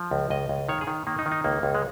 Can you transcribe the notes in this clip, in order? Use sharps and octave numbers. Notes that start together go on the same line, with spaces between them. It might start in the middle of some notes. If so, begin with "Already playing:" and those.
Already playing: F3
C#2
C#2 D#5
C#2
D#3 C#5
G#4
D#3
D#3 A#3
D#4
D#3
D#4
C#2 A#3
C#2
G#3